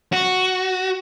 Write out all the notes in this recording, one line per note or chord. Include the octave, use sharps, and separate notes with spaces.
F#4